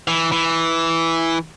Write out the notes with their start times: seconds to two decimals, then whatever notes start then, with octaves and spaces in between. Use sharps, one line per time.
0.08 E3
0.32 E3